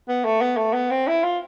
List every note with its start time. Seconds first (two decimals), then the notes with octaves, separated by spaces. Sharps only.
0.08 B3
0.25 A3
0.41 B3
0.57 A3
0.74 B3
0.90 C4
1.08 E4
1.24 F4